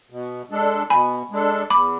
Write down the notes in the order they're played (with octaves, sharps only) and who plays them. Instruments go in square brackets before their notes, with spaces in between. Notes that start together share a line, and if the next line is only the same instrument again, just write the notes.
[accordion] B2
G#3 D4 A4
[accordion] B2 [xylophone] G#5 B5
[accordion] G#3 D4 A4
[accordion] E2 [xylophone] B5 D6